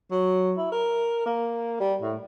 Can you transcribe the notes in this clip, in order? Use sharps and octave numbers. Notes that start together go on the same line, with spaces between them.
F#3
E4
A#4
A#3
G3
A2